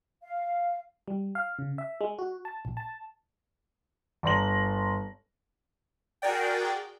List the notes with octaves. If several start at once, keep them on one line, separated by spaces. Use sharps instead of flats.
F5
G3
F5
C#3
E5
G#3
F#4
A5
A#1
A5
G1 D5 A#5 C6 A#6 F#7
F#4 G#4 A#4 D5 G5